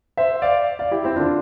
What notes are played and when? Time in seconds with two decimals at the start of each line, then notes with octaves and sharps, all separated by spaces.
0.17 C5 E5
0.42 D5 F5
0.79 D5 F5
0.91 E4 G4
1.04 C4 E4
1.16 D3 D4 F4